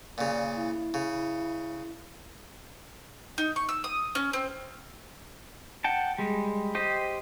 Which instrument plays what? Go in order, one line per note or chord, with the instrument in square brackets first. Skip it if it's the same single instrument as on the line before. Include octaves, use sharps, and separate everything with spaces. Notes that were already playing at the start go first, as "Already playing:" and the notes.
[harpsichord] A#2 C#3 [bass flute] D5
[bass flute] E4
[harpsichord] C#3
[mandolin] D#4
C#6
E6
D#6
C#4
C4
[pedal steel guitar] F#5 G5 A5
G3 G#3
G4 C5 D#5